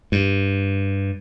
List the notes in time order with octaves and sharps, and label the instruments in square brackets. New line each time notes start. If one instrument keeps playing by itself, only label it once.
[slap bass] G2